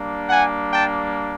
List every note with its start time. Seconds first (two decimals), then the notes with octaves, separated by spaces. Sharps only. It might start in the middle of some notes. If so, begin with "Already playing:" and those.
Already playing: G3 A#3 D4
0.29 F#5 G#5
0.72 G5 A5